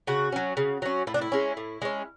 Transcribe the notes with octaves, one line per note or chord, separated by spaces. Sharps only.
C#3 F#4
F#3 C#4
C#3
F#3 C#4
A2 E4
D4
E4
G#3 C#4
A2
G#3 C#4